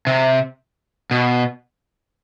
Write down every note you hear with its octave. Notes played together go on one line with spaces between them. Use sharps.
C3
B2